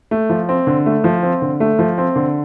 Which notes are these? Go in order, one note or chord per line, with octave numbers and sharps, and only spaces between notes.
A3
F3
C4
D3
A3
F3
C4
D3
A3
F3
C4
D3